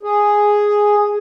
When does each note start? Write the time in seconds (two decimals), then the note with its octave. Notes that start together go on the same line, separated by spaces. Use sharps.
0.03 G#4